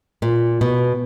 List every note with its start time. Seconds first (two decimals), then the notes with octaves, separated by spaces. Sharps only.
0.22 A#2
0.61 B2